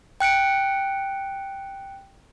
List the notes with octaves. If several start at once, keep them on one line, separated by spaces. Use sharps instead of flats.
G5 F#6 C#7 D7